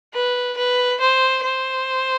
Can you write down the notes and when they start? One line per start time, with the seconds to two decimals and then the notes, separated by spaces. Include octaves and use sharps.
0.14 B4
0.57 B4
1.00 C5
1.44 C5